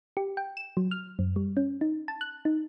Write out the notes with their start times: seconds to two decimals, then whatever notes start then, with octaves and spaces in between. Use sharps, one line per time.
0.17 G4
0.37 G5
0.57 E7
0.77 F#3
0.91 F6
1.19 F#2
1.36 G3
1.57 C#4
1.81 D#4
2.08 A5
2.21 F#6
2.45 D#4